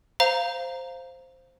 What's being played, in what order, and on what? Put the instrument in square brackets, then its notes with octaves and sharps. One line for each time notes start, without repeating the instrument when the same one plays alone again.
[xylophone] C5 F5 A#5